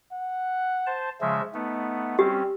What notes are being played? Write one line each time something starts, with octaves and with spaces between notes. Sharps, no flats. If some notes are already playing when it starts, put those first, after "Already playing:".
F#5
C5 A5
C#3 F3 G#3 E5
A3 B3 D#4
G3 C4 C#4 G4